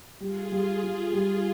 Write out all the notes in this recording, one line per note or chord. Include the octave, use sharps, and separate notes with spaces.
G3 F4 G#4
G3
G3
G3